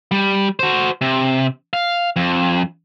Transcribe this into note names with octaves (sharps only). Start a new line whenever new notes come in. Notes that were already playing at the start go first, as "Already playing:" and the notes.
G3
F#4 C5
C3
F5
F2